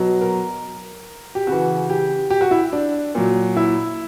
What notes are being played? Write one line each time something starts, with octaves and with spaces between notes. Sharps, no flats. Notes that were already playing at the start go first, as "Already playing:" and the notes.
Already playing: B2 F#3
A#4
G4
C#3 E3 F#4
G4
G4
F#4
E4
D4
A#2 F#3
E4